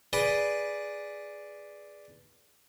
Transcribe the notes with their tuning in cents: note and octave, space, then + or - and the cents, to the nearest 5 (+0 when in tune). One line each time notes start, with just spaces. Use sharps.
G#4 +0 B4 -5 D5 +0